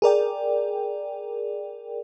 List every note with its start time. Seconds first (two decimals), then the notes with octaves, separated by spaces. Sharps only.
0.02 G#4 A#4 D5 G5